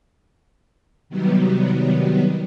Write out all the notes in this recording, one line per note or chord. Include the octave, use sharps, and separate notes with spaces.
C3 D#3 F#3 G3 B3